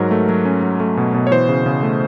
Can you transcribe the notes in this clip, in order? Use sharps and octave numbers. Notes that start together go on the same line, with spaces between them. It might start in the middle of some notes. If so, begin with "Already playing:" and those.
Already playing: G#2 F#3 A#4
A3
F#3
C#4
F#3
A3
B2
B2
C#5
E3 C5
C#3
C#3
A3